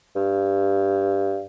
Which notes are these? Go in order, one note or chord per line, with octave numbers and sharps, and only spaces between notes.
G2